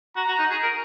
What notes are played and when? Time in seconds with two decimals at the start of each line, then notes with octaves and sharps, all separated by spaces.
0.16 F#4 A#5
0.27 F#4
0.39 D#4
0.51 G#4
0.63 A#4